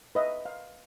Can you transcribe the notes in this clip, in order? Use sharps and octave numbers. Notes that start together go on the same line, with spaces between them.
B4 D#5 E5
F5